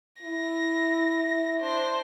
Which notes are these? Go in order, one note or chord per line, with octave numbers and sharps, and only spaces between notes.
E4 A#6
D4 C5